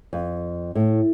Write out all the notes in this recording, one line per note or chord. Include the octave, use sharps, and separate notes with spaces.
F2
A2